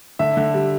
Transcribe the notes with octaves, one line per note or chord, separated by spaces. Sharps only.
D3 E5
D3
G3